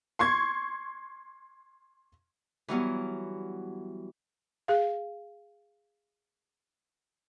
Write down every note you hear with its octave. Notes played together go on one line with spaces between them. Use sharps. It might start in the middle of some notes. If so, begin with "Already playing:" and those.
C6 C#6 G#6
E3 F#3 G3 B3
G#4 F5